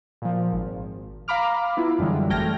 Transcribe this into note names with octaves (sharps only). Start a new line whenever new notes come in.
A#2 F3
G#1
F5 A#5 B5 D6 F6
B3 E4 F4
F#2 D3 E3 G3 G#3
G#1 A3 G5 F6 G#6 A#6